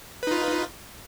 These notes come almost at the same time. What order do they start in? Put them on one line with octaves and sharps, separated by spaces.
B4 D#4 F4